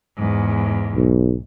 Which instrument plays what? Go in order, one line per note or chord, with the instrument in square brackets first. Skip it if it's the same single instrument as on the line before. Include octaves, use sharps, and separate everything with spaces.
[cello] E2 G#2
[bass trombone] B1